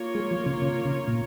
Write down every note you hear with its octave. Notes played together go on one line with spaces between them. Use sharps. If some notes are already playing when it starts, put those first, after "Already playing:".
Already playing: A#3 F4 C#5
G#3
F3
C#3
C#3
C#3
A#2